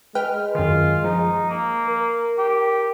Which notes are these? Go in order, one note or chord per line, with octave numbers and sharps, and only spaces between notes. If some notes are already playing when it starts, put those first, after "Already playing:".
G#3 B4 G5 F6
F#2 D#3 F4
F3 D#4
A#3
A#4
G4